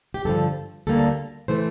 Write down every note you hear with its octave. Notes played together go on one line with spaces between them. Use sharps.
G4
G2 D3 F3 A4
D2 D3 G3 A#3 A4
E3 A3 C5